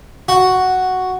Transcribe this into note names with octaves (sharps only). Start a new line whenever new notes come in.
F#4